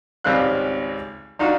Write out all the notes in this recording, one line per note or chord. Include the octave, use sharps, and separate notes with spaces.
G#1 C#2 G3 C4 F5 F#6
D4 D#4 F4 F#4